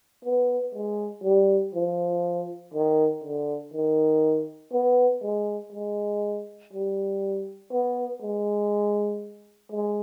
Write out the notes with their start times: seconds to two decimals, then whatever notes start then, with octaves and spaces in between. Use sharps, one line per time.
0.25 B3
0.75 G#3
1.24 G3
1.74 F3
2.74 D#3
3.24 D3
3.74 D#3
4.73 B3
5.23 G#3
5.72 G#3
6.73 G3
7.72 B3
8.22 G#3
9.72 G#3